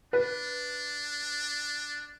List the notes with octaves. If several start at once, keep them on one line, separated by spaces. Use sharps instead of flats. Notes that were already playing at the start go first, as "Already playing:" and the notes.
D4 B4